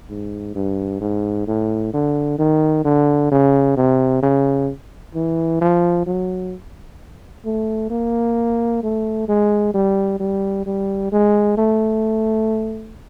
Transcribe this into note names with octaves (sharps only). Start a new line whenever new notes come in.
G#2
G2
G#2
A2
D3
D#3
D3
C#3
C3
C#3
E3
F3
F#3
A3
A#3
A3
G#3
G3
G3
G3
G#3
A3